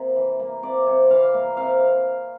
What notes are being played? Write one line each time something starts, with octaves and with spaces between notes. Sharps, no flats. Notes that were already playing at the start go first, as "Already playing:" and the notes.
Already playing: C3 A#3
E3
A#3
C3 D5
C3
E3 F5
A#3
C3 F5